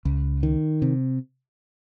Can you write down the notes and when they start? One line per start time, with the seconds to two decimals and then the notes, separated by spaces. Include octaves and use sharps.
0.05 C#2
0.43 D#3
0.82 C3